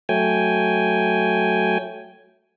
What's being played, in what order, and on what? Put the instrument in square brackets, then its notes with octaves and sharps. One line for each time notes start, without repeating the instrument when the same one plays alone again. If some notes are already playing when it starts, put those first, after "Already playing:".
[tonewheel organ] F#3 A3 G5 G#5